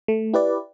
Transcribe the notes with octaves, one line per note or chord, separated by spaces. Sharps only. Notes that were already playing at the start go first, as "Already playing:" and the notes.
A3
E4 G4 B4 D5